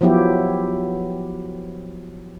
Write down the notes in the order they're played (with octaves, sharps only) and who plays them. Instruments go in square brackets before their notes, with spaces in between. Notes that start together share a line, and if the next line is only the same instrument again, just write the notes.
[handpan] F3 F#3 B3 E4 G4